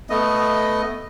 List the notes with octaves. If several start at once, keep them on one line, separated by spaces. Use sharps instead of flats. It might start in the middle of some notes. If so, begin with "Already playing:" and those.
A3 B3 D#5